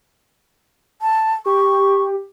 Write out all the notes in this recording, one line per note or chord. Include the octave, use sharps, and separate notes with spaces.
A5
G4 C#6